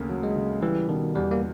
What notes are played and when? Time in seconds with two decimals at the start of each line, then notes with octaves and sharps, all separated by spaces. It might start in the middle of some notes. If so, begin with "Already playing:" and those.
Already playing: D2 C#3 A#3
0.09 F#3
0.23 G#3
0.36 C#3
0.62 E3 G3
0.88 B2 D#3
1.15 E2 G3
1.31 A#3